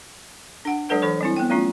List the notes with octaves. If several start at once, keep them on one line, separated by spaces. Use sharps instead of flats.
D4 F#5
F#3 G#3 D4 A4 B4 F#5
E3 A4 C#5 C#6
G3 C4 E4
B3 G5
F#3 A3 C#4 F4